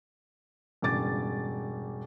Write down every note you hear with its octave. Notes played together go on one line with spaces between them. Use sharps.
E1 G2 C#3 D6 A6